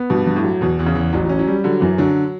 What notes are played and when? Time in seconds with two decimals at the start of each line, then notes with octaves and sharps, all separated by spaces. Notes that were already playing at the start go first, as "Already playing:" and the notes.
Already playing: B3
0.10 G2 B2
0.27 G2
0.36 A2
0.44 F#3
0.61 E2 B2
0.79 E2
0.86 C#3
0.95 E2
1.13 A1 F#3
1.25 F#3 C#4
1.39 F#3
1.48 G3
1.64 D3 F#3
1.81 F#2 E3
1.98 D3 F#3